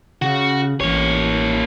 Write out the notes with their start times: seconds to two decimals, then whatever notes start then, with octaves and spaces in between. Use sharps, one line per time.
0.22 C#3 F#4
0.81 A1 A#3 C#5